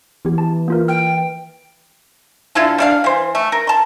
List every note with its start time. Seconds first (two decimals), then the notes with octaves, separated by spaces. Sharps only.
0.25 E3 B3 G4
0.38 A5
0.68 A#3 F4 A#4
0.88 G5 F6
2.55 D3 E4 F4 A4
2.78 G3 D4 F5
3.04 E3 C5
3.35 A3
3.52 A#4
3.67 A5 C6